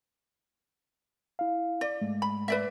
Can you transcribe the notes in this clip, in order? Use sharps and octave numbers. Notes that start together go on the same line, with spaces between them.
E4 F5
D5
G#2 G#3 A3
B5
B4 D5 E5